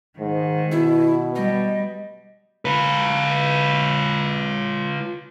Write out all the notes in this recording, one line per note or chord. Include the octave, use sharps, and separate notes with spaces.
G#2 D#3
B2 E4
G3 D#5
F4 B4